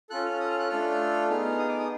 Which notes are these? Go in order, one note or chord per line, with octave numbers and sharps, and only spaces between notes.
C#4 F4 A4 F#6
F6
D#6
F6
F#6
A3 D4 F4 A4 F6
B3 D#4 G#4 F6
D#6
D6
D#6